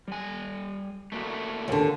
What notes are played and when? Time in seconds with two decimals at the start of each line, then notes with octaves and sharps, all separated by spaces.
0.08 G3 G#5
1.12 A3 A#3 F#4
1.68 D#2 D3